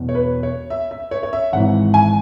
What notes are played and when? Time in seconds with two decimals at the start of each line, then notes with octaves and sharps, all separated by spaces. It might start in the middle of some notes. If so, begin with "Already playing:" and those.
Already playing: E1 E2 B2
0.09 C#5
0.15 B4
0.43 C#5
0.70 E5
0.91 E5
1.11 C#5
1.23 C#5
1.33 E5
1.53 G#1 G#2 E3 F#5
1.94 G#5